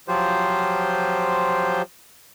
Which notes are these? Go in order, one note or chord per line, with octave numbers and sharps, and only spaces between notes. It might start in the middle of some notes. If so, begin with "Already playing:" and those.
F3 F#3 F4 G4 C5